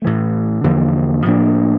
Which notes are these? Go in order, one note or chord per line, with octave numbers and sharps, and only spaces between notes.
A2 E3 A3
E2 D3 F3 A#3
A2 F3 A#3 D4